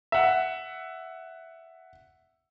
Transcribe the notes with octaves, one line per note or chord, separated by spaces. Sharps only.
E5 F#5